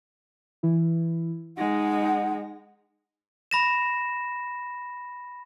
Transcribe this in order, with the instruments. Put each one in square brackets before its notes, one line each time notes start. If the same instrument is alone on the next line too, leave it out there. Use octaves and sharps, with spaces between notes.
[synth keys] E3 E4
[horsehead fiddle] G#3 D#4 [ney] F#5 [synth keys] A#6
[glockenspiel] B5 A#6 E7